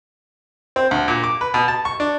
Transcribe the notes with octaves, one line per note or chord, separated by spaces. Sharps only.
C4
D2
A#2
D6
B4
B2
A5
C#6
D4